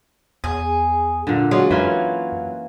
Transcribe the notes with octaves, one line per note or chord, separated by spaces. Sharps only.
E2 G#4
A#2 D3
F#3 G#3 F4 G#4
F#2 E3 A#3 C#4